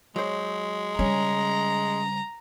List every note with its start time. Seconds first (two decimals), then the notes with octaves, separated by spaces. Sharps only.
0.16 F#3 G#3 C5
0.99 C#3 G3 C#4 A#5